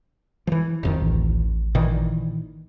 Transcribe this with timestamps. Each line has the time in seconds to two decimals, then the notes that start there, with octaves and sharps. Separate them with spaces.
0.47 E3 F3
0.83 D1 F2 D#3
1.02 A1
1.75 A#2 D#3 E3